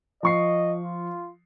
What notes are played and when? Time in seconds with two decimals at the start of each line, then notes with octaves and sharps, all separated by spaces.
0.23 F3 D#5 C#6 C7
0.83 F4